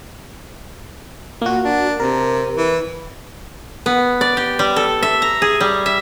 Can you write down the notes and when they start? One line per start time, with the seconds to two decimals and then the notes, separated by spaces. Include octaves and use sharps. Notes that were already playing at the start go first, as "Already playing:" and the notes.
1.42 A#2 A#3 F#4
1.65 D4
2.00 C3 A#4
2.57 E3
3.86 B3
4.21 D5
4.37 G4
4.59 G3
4.76 A4
5.03 E5
5.22 A#5
5.42 G#4
5.60 G3
5.86 E5